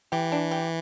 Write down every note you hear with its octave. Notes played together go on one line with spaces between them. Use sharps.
E3 G4
D4
G4